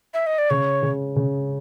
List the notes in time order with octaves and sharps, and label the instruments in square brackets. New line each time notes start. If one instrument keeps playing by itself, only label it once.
[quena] E5
D#5
D5
[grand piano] C#3 [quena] C#5
[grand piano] C#3
C#3